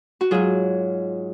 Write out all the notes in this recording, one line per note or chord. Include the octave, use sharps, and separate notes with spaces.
F#4
G#2 F#3 F4 G#4